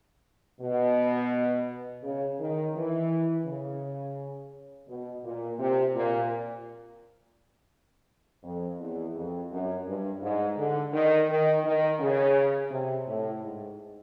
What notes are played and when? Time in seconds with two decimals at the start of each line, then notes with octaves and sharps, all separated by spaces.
0.61 B2
2.03 C#3
2.40 D#3
2.75 E3
3.46 C#3
4.88 B2
5.24 A#2
5.59 C3
5.95 A#2
8.43 F2
8.79 E2
9.15 F2
9.51 F#2
9.86 G2
10.21 G#2
10.57 D3
10.92 D#3
11.28 D#3
11.64 D#3
11.99 C#3
12.70 C3
13.07 A2
13.42 G#2